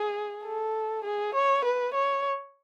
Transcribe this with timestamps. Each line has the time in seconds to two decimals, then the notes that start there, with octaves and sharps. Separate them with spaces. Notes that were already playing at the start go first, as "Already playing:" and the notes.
Already playing: G#4
0.44 A4
1.04 G#4
1.35 C#5
1.65 B4
1.94 C#5